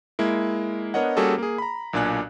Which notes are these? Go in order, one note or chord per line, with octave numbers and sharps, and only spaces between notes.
G#3 A#3 E4
B3 D4 A#4 C#5 D#5 F#5
G3 A#3 C#4 F#4 G#4 A4
A#3 G#4
A#5 B5
B1 A#2 D4 G#5 F#6